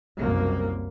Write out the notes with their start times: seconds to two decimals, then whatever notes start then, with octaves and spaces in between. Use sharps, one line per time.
0.18 F#1 C2 F#2 A#3